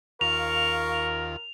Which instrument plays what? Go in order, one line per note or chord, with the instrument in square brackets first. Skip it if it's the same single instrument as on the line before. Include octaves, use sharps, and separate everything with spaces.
[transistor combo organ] D#2 F4 [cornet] A#4 [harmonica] F5 C#6 [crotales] F7